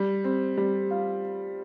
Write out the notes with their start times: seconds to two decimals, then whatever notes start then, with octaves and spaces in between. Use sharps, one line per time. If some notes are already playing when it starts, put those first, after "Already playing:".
Already playing: G3
0.24 C4
0.58 G3
0.91 F4